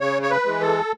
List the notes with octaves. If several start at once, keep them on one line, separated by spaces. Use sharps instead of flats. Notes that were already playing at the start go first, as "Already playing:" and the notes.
C#3 C#5
C#5
B4
E3 G#3
A4